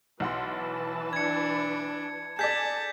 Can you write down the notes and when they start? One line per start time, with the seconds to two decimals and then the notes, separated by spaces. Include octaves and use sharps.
0.20 B1 E3 B4 F#5 A5 C6
1.13 D4 G#6 C#7
2.39 G#4 A4 D5 A5 G6 G#6 B6